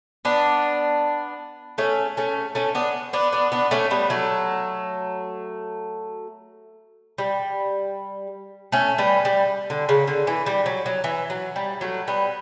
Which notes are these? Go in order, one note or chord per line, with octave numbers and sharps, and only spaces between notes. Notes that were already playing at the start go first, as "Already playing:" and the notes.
B3 D4
A3 C#4
A3 C#4
A3 C#4
B3 D4
B3 D4
B3 D4
B3 D4
A3 C#4
G3 B3
F#3 A3
G3
A3 C#4
G3 B3
G3
D3
C#3
D3
E3
G3
F#3
F#3
E3
F#3
G3
F#3 A3
G3 B3